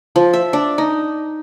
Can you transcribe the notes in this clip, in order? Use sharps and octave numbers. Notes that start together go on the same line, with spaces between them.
F3
E5
D4
D#4